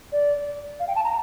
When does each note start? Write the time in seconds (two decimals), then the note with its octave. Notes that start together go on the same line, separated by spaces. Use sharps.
0.12 D5
0.79 F5
0.87 G5
0.95 A5
1.04 A#5